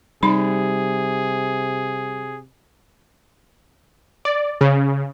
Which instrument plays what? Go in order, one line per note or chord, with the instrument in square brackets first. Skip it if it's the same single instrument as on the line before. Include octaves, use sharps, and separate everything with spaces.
[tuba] C3 [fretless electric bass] G3 [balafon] D#4 B5 [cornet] G#4
[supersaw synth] D5
C#3